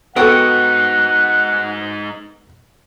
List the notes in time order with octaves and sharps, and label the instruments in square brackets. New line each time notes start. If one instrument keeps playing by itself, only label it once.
[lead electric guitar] G#2 D#4 [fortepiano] B3 A4 [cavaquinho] F#4 G5 D#6 [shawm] F#5